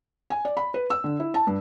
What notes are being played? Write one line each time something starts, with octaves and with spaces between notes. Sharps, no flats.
G#5
D5
B5
B4
E6
D3
E4
A5
G2